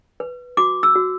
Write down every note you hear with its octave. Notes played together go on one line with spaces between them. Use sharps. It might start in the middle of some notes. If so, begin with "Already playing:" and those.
B4
F#4 D6
E6
F#4